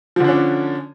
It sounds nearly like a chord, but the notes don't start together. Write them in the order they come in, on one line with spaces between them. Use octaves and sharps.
F3 D3 D4 C#4